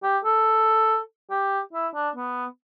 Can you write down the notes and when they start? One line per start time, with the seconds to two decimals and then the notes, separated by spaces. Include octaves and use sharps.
0.03 G4
0.24 A4
1.30 G4
1.73 E4
1.94 D4
2.15 B3